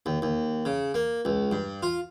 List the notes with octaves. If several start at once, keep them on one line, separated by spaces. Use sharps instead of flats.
D#2
D#2
C#3
A#3
C#2
G2
F4